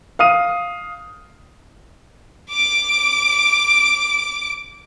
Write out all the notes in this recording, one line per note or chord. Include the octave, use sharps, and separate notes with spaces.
F5 D#6 D#7
D6 D7